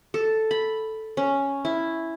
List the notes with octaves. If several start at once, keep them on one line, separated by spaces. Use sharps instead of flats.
A4
B5
C#4
E4